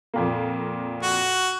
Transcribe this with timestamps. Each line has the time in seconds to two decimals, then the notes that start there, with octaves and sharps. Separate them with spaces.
0.14 F2 A#2 A#3
1.03 F#4